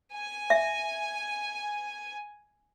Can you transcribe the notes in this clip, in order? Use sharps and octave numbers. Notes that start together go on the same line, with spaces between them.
G#5
E5